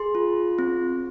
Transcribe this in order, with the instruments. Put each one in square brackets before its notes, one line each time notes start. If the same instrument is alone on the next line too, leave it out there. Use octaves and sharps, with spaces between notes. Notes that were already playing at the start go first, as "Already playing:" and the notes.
Already playing: [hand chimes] G#4 C6
F4
C4